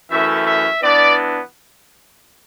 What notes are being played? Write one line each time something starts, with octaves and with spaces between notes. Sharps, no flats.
F#2 E3 A3 C#4 E5
E5
E3 B3 D4 D5